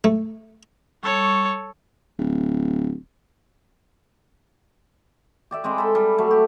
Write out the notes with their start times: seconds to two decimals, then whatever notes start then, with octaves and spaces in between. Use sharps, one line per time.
0.04 A3
1.03 G3 A4 C#5 C#6
2.19 D1
5.51 G4 D5 E5
5.64 G#3 C4 B5 D6
5.78 A4 B5
5.95 G3
6.18 F#3 A3
6.31 G4